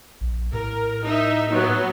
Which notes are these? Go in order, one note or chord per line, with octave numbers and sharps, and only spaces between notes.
A#1
A2 A#4
D#4 E5
F#3 B3